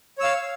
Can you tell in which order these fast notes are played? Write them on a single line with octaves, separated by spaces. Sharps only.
C#5 E6 F5